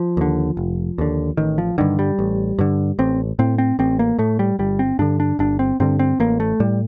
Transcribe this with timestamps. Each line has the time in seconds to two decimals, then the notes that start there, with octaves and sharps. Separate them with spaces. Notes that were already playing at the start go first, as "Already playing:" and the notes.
Already playing: F3
0.17 D#2 D3
0.57 F1
0.98 D#2 D3
1.37 A1 D#3
1.58 F3
1.78 G2 D3 D#3
1.99 G3
2.19 A1
2.59 G2 D3
2.99 A1 C4
3.39 A2 C4
3.58 C4
3.79 A1 C4
3.99 A#3
4.18 A2 A3
4.39 G3
4.59 G1 G3
4.79 C4
4.99 G2 D3 D4
5.20 D4
5.39 G1 D4
5.59 C4
5.80 G2 D3 C4
5.99 C4
6.20 A1 A#3
6.40 A3
6.60 A2 G3